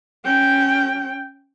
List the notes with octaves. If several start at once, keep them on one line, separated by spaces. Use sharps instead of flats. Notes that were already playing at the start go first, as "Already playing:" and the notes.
C#4 G5